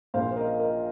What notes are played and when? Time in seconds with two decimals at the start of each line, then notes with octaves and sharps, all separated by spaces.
0.14 A#1 A#2 A#3 F4 C5 F5
0.31 C5
0.36 A#4 D#5
0.59 A#4 D#5